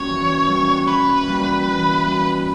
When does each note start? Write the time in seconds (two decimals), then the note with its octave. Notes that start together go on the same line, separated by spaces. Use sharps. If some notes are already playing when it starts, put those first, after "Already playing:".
Already playing: G3 A#3 C#4 F#4 C#5
0.10 E3
0.48 G3 A#3 C#4 F#4
0.88 E3 B4
1.27 G3 A#3 C#4 F#4
1.66 E3
2.05 G3 A#3 C#4 F#4